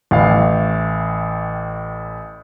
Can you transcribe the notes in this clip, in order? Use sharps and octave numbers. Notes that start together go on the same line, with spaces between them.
A1 A2 E4 F5